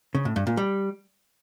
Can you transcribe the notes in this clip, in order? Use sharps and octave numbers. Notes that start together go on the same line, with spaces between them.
C#3
A2
G2
A#2
G3